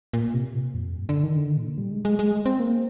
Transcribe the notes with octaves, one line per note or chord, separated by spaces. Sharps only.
A#2
C3
A#2
F2
G2
D3
D#3
D3
A#2
G3
G#3
G#3
G#3
C4
A#3